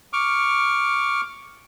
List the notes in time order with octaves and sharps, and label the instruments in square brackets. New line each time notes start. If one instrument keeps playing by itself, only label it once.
[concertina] C#6 D6 F6